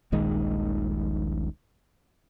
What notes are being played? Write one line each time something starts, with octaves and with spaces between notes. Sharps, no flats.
D#1 A#1 D#3 G#3